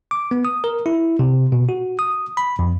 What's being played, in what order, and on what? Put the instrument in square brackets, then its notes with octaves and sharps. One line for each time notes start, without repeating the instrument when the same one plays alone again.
[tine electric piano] D6
B3
D#6
A#4
E4
C3
B2
F#4
D#6
B5
F2